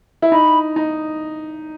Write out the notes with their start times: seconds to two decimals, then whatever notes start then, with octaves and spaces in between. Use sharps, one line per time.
0.22 E4
0.32 D#4 B5
0.76 D#4